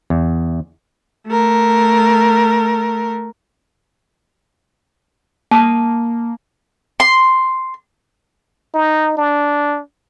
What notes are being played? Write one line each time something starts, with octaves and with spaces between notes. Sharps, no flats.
E2
A3 A#4
A#3 A5 D#6
C6
D#4
D4